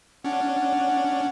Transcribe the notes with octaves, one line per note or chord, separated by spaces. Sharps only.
C#4 D4 F#5